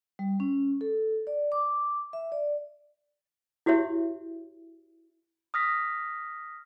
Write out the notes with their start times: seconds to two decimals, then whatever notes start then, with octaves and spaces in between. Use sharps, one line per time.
0.19 G3
0.40 C#4
0.81 A4
1.27 D5
1.52 D6
2.13 E5
2.32 D5
3.66 E4 F#4 G4 C#5 E5
5.54 D#6 F6 A#6 B6